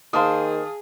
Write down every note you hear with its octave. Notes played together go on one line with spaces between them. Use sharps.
D#3 A#3 G#4 C5 F5 A5 D#6